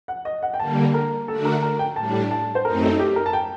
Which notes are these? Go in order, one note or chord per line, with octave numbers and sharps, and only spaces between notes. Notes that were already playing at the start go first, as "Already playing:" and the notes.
F#5
D#5
F#5
G5
D3 G3 A#3 A5
A#4
D3 A3 D4 F#4 A4
A#4
A#4
G5
A2 G3 D4 A5
A5
C5
F#2 F#3 A3 C4 D#4 A#4
A4
G4
A#4
A5
G5